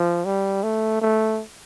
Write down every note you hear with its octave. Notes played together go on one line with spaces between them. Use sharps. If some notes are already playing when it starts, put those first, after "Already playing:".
Already playing: F3
G3
A3
A3